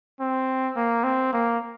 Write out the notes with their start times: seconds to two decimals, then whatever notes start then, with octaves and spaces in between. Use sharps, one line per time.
0.20 C4
0.77 A#3
1.04 C4
1.33 A#3